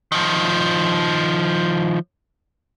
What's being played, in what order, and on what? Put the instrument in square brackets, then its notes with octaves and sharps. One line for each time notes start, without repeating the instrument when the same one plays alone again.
[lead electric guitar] D#3 F3